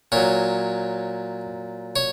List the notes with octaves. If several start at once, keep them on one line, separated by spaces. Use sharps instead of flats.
A#2 F#3 C#5
C#5